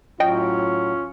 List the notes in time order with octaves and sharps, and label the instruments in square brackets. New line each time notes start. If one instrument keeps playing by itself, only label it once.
[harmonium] A2 F#3 [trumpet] C#4 [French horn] F4 [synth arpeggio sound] D#5 G5